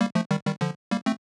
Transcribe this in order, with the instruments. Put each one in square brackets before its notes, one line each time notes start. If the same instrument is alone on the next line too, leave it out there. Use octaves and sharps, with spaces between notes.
[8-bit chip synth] G3 A#3
F3 A3
D#3 G3
D#3 G3
D3 F3
G3 A#3
A3 C4